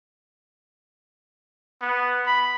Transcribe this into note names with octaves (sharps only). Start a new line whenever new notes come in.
B3
B5